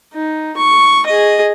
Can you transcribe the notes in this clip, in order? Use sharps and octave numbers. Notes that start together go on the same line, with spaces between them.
D#4
C#6
G#4 D#5